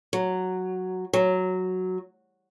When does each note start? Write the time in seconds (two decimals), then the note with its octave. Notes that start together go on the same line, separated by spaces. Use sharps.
0.13 F#3
1.13 F#3